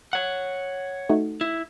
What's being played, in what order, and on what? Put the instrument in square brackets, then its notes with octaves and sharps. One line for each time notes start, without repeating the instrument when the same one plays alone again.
[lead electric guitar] C#5 F#5
[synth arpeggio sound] A3 D#4 F#4
[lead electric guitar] E4